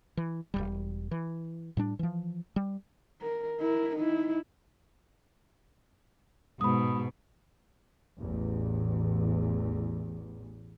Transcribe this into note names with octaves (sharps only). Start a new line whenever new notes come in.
E3
E1 C#2 G3
E3
A2 G3 D4
E3 F3
G3
A#4
E4 A#4
D#4 E4
G#2 B2 B5 D#6
A1 E2